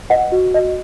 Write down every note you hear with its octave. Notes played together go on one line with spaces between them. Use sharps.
B4 D#5 F#5
F#4
F#4 D#5